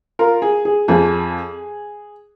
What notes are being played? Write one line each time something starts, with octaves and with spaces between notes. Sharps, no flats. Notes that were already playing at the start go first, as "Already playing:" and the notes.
F4 A#4
G#4
G#4
F2 F3 G#4